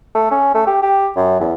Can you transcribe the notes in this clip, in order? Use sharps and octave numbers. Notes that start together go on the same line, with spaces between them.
A3
C#4
A3
G4
G4
F#2
E2